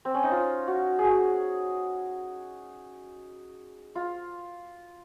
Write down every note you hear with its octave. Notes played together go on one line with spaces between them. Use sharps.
C4
C#4
D#4
F4
F#4
G#4
F#4
F4